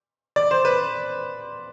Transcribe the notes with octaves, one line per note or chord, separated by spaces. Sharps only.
D5
C5
B4